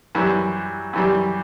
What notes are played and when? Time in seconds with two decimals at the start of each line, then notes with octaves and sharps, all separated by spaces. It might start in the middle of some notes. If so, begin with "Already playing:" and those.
0.15 F#2 E3 G3
0.93 F#2 E3 G3